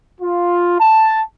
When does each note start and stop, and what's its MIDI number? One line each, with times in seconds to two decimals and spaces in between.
0.21 0.80 65
0.81 1.21 81